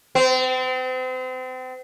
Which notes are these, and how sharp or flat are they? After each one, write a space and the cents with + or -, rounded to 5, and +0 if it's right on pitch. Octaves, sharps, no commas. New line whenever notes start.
C4 -35